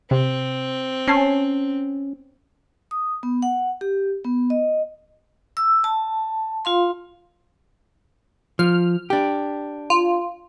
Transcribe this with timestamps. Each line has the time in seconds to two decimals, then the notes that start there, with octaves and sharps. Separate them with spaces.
0.11 C3 C4
1.08 C#4 G#5 A5 C7
2.91 D#6
3.23 B3
3.42 F#5
3.81 G4
4.24 B3
4.50 D#5
5.57 E6
5.84 A5
6.65 F4 F5 C6
8.59 F3 F6
9.10 D4 G4
9.90 F4